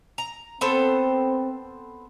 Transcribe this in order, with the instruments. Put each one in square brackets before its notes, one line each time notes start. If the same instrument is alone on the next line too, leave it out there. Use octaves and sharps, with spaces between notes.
[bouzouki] A#5
[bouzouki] B3 A4 C5 [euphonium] C4